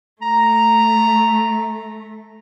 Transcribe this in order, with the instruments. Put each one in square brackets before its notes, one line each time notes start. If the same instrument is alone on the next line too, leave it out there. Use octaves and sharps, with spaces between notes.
[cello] A3 [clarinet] A#5